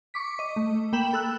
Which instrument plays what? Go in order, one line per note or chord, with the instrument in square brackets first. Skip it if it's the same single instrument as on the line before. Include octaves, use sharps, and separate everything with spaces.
[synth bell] C#6 D6 B6
D#5
A3
A#3 G5 B5 E7 F#7
A4 E6 F#6